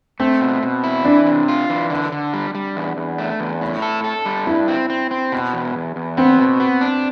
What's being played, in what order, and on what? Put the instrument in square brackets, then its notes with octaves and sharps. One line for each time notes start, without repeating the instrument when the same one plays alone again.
[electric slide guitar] A3 [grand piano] C4
[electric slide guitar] B2
B2
E4
[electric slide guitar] E3 [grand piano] D4
[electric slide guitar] C3
F4
E3
D3
D3
G3
G3
E2
E2
A3
E2
A2
A4
A4
G3
[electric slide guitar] G2 [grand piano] E4
[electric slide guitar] C4
C4
C4
B2
E2
E2
E2
[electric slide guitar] B3 [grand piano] C4
[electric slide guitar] B2
B3
D4